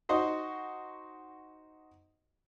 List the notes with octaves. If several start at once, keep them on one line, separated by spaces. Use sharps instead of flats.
D#4 F#4 C5 D#5